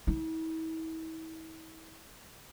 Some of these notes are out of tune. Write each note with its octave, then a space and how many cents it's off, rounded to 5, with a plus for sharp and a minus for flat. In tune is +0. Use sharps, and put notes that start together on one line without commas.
E4 -40